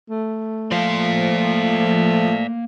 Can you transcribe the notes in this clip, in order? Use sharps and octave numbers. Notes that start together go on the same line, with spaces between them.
A3
F3 A#3 D5 F5 C6